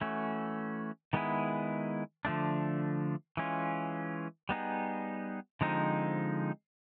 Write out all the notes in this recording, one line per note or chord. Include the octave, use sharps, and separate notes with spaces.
E3 A3 C#4 F#4
D#3 G#3 B3 E4 G#4
D3 F3 A3 D4
E3 G#3 C#4 F4
G3 B3 D#4 G#4
D3 F3 G#3 C4 D#4